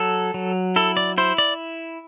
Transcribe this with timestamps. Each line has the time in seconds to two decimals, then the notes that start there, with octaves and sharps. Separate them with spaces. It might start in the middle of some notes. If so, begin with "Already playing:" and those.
Already playing: F#3 A4
0.34 F#3
0.76 E4 A4
0.97 D5
1.18 E4 C5
1.38 D5